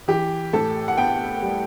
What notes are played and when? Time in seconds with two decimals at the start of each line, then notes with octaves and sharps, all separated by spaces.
0.08 E3 G4
0.53 A2 A4
0.88 F#5
0.98 B3 G5
1.43 G3